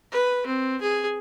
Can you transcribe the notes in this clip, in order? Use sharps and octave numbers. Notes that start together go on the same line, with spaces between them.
B4
C4
G#4